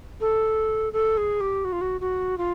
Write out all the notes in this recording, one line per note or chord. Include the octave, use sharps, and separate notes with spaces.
A4
A4
G#4
G4
F#4
F4
F#4
F#4
F4